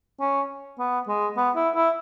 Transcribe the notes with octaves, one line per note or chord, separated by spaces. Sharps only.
C#4
B3
G#3
B3
E4
E4